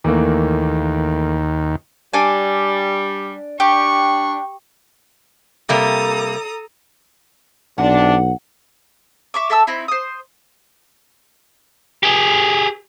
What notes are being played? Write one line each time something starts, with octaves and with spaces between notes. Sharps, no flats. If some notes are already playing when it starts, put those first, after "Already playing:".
D#2 E3 A3 A#3
G3 D4 G#5
D4 G4 C#6
C3 G3 A#3 A4 A#5 D#6
B1 C3 D4 F#5
E5 C#6 D6
A4 E5 A5 E6
C4 D#4 E4 B5
C5 D#6
G4 G#4